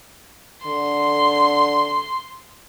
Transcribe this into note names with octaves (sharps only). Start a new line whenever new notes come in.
D3 C6